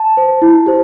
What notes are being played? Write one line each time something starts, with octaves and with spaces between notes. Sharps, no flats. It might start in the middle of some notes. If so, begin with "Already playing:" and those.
Already playing: A5
C5
E4
G4 C5